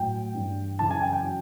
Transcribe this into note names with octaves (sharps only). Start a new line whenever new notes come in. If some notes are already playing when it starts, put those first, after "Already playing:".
Already playing: A2 F#3 G5
G2 E3
F#2 C#3 E3 A5
G#5
G5
G5
F#3